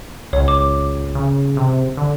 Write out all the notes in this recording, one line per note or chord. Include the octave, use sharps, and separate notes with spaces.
C#2 C#5
D6
C#3
C3
D3